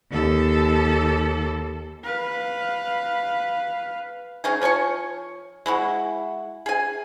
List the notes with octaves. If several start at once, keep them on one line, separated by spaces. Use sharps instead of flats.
D#2 A4
B4 F5
G#3 C#4 D#4 G#4
F3 C#5 G#5 C#6
G#3 E4 F#4
G#4 G#5